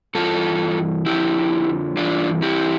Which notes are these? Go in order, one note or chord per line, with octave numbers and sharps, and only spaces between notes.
G2 E3 F4 A4
F2 D3 F3 E4 G4
G2 E3 D4 F4
E4 G4